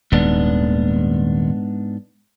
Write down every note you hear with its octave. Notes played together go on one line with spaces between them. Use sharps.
D#1 D#2 G#2 B3 D4